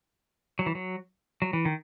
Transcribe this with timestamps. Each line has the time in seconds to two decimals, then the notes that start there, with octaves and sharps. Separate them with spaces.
0.59 F#3
0.66 E3
0.75 F#3
1.42 F#3
1.53 E3
1.65 D#3